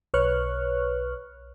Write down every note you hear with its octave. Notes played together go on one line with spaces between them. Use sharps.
B1 B4 C#5 C#6 F6 F#6